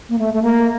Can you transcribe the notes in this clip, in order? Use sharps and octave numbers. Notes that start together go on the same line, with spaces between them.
A#3
A3
A3
A#3